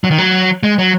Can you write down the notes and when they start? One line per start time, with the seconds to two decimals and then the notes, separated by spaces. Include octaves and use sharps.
0.04 F#3
0.11 D#3
0.18 F#3
0.63 G#3
0.78 F#3